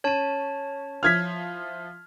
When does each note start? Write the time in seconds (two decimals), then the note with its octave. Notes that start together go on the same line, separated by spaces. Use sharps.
0.04 C#4 C#5 A5 D#7
1.03 F3 E4 F4 F6 G#6 B6